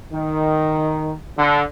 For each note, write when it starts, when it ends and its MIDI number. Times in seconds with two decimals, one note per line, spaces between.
0.11 1.13 51
1.37 1.62 50